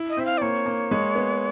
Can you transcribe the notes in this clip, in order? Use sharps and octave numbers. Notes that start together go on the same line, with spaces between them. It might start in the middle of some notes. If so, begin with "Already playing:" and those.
Already playing: E4
D#5
C4 E5
F5
D5
A#3 C#5
A#3
G#3
B3